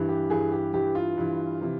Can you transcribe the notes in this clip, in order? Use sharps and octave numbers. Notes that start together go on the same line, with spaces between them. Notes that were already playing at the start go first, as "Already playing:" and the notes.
Already playing: G2 E3
G4
G2 E3 G#4
G4
G2 E3 G4
F4
G2 E3
C3 E3